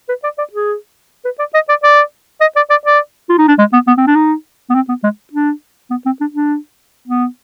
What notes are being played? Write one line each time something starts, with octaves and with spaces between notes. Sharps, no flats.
B4
D5
D5
G#4
B4
D5
D#5
D5
D5
D#5
D5
D5
D5
F4
D#4
D4
G#3
B3
B3
C4
D4
D#4
B3
C4
B3
G#3
D4
B3
C4
D4
D4
B3